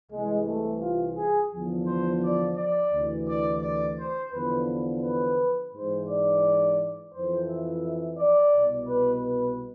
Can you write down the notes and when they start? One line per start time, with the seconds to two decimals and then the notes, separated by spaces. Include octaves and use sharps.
0.11 C2 C3 E3 G#3
0.47 A3
0.81 F4
1.16 G#4
1.52 E2 D3 F3
1.86 C5
2.22 D5
2.57 D5
2.92 D2 C3 E3
3.28 D5
3.62 D5
3.97 C5
4.32 E2 D3 F3 B4
5.03 B4
5.73 G#2 E3 C5
6.08 D5
7.13 F2 E3 C5
7.49 E5
8.18 D5
8.54 C2 B2
8.89 B4
9.24 B4